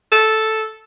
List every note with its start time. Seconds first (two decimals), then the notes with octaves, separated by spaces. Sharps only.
0.12 A4